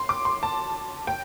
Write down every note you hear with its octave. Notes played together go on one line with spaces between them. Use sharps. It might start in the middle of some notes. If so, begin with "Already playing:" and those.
Already playing: C6
D6
C6
A5
G5